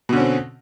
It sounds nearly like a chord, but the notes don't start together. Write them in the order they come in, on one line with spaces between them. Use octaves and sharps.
B2 D3 C#4 C4